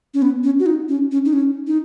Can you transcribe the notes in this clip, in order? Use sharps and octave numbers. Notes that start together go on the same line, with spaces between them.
C#4
B3
C#4
F#4
D#4
C#4
C#4
D#4
C#4
D#4